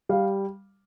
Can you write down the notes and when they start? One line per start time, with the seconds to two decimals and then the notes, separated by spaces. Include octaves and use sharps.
0.09 G3 F5